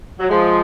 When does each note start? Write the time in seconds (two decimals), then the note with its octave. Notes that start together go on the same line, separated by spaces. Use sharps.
0.19 F#3
0.30 F3 G#3